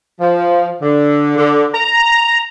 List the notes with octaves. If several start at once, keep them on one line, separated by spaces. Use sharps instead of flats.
F3
D3
D3
A#5